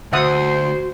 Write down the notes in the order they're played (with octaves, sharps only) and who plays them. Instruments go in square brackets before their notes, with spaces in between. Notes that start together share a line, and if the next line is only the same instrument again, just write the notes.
[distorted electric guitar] D2 [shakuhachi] F#4 [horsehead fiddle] C5 [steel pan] E5 F#5 D#6